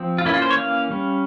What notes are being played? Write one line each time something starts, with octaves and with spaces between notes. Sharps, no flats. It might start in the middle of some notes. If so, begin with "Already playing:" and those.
Already playing: F3 C4
F4
E3 A#3 C#4 E4
F4
C5
C#5
F5
G3 C#4